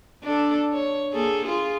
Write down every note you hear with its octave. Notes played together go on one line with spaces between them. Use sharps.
D4 A4
C#5
A#3 G#4 A4
F4 G#4